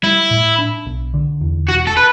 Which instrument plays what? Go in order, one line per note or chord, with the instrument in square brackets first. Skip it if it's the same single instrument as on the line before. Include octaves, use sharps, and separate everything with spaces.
[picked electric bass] G3 [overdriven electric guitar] E4
[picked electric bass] A2
D4
B1
D3
E2
[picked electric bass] E1 [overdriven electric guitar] F#4
[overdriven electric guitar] A4
B4